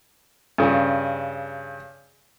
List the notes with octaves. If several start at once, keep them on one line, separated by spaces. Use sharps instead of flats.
G2 C#3